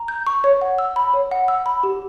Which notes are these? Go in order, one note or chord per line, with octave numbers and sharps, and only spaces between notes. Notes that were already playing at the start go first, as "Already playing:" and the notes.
Already playing: A#5
G6
C#6
C#5
F#5
E6
B5
C#5
F#5
E6
B5
G4